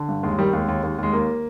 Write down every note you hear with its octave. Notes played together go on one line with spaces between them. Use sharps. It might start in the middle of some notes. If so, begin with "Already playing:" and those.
Already playing: D3
G2
D#2 G#3
D#3 G3
D#2 G#3
D#2
D#2
D#2 G#3
D#2 A#3